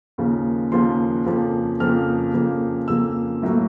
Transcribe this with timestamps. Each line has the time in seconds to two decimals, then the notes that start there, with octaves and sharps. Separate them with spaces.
0.18 D#2 C#3 F3 A#3
0.72 D#2 C#3 F3 A#3 C6
1.26 F2 C#3 F3 A#3
1.80 F2 C#3 F3 A#3 F6
2.34 F2 C#3 F3 A#3
2.88 F2 C#3 F3 A#3 E6
3.42 B1 A2 F#3 A#3